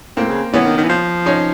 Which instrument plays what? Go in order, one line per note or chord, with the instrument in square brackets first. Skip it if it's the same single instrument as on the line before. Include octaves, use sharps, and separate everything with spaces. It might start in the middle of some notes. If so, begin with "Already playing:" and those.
[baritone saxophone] A2 [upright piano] A#3 C4
[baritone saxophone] C#3
[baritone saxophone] E3 [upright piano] B3 C#4
[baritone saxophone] D#3
D#3
E3
F3
[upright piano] C#4 D#4